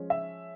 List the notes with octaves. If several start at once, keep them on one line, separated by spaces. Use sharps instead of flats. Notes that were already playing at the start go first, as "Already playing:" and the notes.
Already playing: F3 G#3 C#4
E5